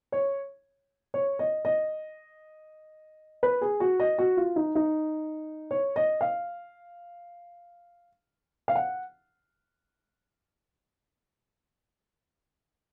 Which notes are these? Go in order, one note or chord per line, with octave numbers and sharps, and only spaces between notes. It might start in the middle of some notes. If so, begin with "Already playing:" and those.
C#5
C#5
D#5
D#5
B4
G#4
F#4
D#5
F#4
F4
D#4
D#4
C#5
D#5
F5
F5
F#5